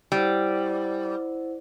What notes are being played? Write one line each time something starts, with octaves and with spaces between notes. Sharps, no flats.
G3 E4 C5 F#5